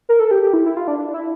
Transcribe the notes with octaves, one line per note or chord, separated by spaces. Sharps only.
A#4
A4
G4
G4
E4
E4
F4
D4
D4
E4